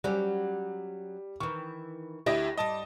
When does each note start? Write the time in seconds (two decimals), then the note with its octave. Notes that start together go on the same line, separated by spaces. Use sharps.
0.04 F#3 G3 C#4 G4
1.40 D#3 E3 C#6
2.26 D2 E4 G4 D#5 E5 A#6
2.58 G2 G3 D#5 A5 D#6